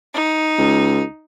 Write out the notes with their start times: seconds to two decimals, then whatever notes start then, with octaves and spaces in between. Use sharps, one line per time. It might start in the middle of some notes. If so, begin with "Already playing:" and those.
0.14 D#4
0.58 C#2